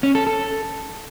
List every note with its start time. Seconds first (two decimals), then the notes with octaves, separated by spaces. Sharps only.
0.03 C#4
0.15 A4
0.27 A4